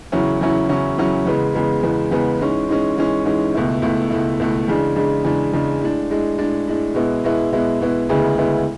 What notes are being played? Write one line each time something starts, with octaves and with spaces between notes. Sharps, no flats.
E2 C#3 F#3 C#4 E4
E2 C#3 F#3 C#4 E4
E2 C#3 F#3 C#4 E4
E2 C#3 F#3 C#4 E4
E2 C#3 G#3 B3
E2 C#3 G#3 B3
E2 C#3 G#3 B3
E2 C#3 G#3 B3
G#2 E3 G#3 C#4
G#2 E3 G#3 C#4
G#2 E3 G#3 C#4
G#2 E3 G#3 C#4
C#2 B2 A3 E4
C#2 B2 A3 E4
C#2 B2 A3 E4
C#2 B2 A3 E4
E2 C#3 G#3 D4
E2 C#3 G#3 D4
E2 C#3 G#3 D4
E2 C#3 G#3 D4
A2 G#3 D4
A2 G#3 D4
A2 G#3 D4
A2 G#3 D4
B2 G#3 B3 E4
B2 G#3 B3 E4
B2 G#3 B3 E4
B2 G#3 B3 E4
D2 C#3 G#3 B3 E4
D2 C#3 G#3 B3 E4